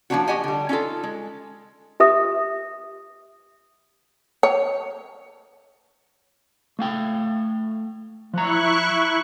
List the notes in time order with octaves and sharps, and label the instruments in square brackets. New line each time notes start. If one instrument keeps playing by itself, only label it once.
[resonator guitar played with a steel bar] F3 G3 A#3 C#4 D4 F#4
F#4 G4 D#5 F#5 G#5
D3 G3
C#4 D#4 F4 A4
G#3
[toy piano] G4 E5 D#6
[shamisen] C#5
[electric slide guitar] A3 F5 G5
[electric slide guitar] F3 A#5 [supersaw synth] E4 C#6 F#6